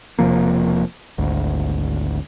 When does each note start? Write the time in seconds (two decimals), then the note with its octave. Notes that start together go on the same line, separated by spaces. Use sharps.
0.19 E1 C3 F3 A#3
1.18 G#1 D2